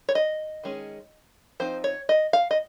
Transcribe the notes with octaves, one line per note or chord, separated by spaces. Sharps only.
C#5
D#5
D#3 G#3 C#4
F3 C4 D#4 C5
C#5
D#5
F5
D#5